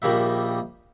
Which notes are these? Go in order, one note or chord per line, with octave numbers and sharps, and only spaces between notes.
A#1 D#3 G3 A#3 E5